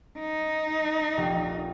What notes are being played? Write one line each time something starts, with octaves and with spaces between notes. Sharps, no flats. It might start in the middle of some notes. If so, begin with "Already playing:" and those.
D#4
F1 A#1 G4